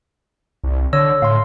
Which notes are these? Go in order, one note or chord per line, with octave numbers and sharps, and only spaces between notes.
C2
D3 C#5 E6 A#6
A2 F5 C6